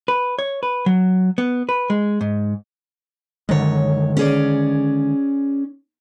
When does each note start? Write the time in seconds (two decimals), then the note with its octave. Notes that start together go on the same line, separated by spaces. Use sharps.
0.08 B4
0.39 C#5
0.63 B4
0.86 F#3
1.38 B3
1.69 B4
1.90 G#3
2.21 G#2
3.49 F#2 D3 D#3 G#3 C#5
4.17 C#4 G#4 D5